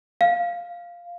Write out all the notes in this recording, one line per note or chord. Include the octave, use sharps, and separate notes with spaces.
F5